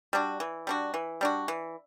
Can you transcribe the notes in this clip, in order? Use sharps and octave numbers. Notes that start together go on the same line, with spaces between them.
G3 D4 F#4
E3
G3 D4 F#4
E3
G3 D4 F#4
E3